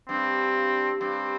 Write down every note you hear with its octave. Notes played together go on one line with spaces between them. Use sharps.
G2 C4
G2 C4